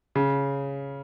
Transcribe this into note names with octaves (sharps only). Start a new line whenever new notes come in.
C#3